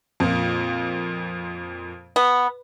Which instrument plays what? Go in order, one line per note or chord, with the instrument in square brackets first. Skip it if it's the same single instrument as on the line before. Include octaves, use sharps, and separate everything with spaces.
[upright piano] F2 A#2
[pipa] B3